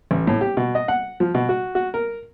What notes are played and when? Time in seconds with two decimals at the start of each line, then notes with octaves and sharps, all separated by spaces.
0.11 A1
0.27 A2
0.41 G4
0.57 B2
0.75 D#5
0.88 F#5
1.20 F3
1.35 B2
1.49 F#4
1.75 F#4
1.94 A#4